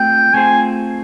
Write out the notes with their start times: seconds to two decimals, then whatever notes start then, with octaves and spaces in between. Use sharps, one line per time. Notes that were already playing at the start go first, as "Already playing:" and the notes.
Already playing: A3 C4 F4 G#4 C5 G5
0.34 A3 C4 F4 G#4 C5 G#5